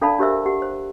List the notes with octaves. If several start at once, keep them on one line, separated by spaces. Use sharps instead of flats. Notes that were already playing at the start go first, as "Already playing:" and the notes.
D4 A4 D5 F5 A5 B5
D4 G4 A#4 C5 E5 E6
G4 F#5
C5